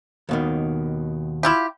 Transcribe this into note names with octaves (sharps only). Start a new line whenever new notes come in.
D#2 B2 D#3
E4 F4 G4